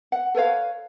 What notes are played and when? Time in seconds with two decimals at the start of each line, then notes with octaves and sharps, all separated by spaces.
0.12 F#5
0.35 A4 B4 C#5 F5